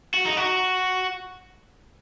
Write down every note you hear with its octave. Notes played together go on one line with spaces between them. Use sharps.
F#4
D#4
F#4